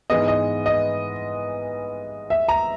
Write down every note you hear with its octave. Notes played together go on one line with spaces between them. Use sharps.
G#2 E3 G#3 B3 D#5
D#5
D#5
E5
A#5